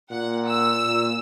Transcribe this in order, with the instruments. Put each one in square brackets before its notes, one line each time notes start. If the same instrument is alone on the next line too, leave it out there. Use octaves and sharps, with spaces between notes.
[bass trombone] A#2 [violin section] F#5
[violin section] E6
[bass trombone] A#2